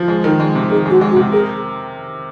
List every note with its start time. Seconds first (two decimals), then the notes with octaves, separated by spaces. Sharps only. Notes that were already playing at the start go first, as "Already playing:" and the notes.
Already playing: F3
0.08 G#3
0.24 D#3
0.40 G#3
0.55 C3
0.70 D#3 G#4
0.86 G#3 F#4
1.01 G#3
1.12 F#4
1.16 C3
1.32 G#4 A#4